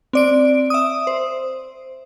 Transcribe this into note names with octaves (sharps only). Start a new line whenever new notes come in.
C4 D5 D7
E5 D#6
C5